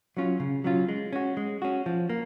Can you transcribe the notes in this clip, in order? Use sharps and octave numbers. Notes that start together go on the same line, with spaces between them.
F#3 C#4 F4
C#3
F#3 C#4 F4
G#3
C#4 F#4
G#3
C#4 F#4
F3
A#3